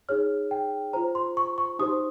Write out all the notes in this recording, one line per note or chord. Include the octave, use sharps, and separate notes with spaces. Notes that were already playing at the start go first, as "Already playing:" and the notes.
D#4 G#4 C#5 F6
G5
F4 C5 A#5
C6
C#6
C#6
D#4 G4 C5 D#6